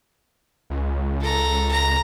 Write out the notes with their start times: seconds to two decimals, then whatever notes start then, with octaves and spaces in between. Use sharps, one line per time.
0.70 C#2
1.21 A4 A#5
1.71 A#5